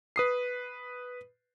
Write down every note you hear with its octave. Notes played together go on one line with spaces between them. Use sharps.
B4 D#6 C7